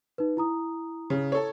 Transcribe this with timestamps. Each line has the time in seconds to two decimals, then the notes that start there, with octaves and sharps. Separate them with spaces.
0.18 D#4 B4
0.37 E4 A#5 D#6
1.10 C#3
1.32 A4 C#5